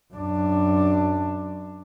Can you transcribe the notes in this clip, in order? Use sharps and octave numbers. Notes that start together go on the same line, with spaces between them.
F#2 D4